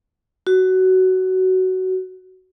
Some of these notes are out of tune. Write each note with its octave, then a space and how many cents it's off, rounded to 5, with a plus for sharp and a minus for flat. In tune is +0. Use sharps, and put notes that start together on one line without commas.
F#4 +15